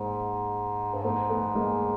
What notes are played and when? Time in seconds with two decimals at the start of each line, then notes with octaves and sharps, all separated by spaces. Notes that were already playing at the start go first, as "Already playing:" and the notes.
Already playing: G#2 G#3 A#3
0.94 G2
1.03 G#2 A3 B3
1.30 A3 B3
1.55 G#3 A#3